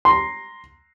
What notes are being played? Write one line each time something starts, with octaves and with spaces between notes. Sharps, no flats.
A#5 C6